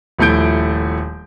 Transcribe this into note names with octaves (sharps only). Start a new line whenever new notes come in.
D#1 F3 A3 E4 G6 D7